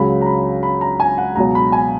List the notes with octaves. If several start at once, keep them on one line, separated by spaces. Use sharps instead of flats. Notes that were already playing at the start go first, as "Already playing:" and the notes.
Already playing: C#2 C#3 F#3 B5
A#5
B5
B5
A#5
G#5
F#5
C#2 B2 F#3 A#5
B5
G#5